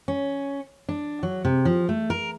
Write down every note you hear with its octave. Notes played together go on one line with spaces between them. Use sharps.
C#4
D4
F#3
C3
F3
A3
A#4